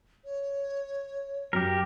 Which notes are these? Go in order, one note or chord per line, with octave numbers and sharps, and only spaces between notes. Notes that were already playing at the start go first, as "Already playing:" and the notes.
C#5
F#2 G4 A#4